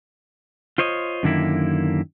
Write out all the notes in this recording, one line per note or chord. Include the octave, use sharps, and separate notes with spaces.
F4 C5 C#5 D#5
F#2 D3 D#3 A#3 E4